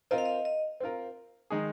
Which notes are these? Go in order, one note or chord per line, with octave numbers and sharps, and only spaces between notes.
C4 F4 A#4 D#5
F5
D#5
D#5
C4 F4 A#4
D#3 G#3 D#4 G#4